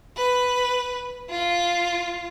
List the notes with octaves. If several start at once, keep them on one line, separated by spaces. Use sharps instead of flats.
B4
F4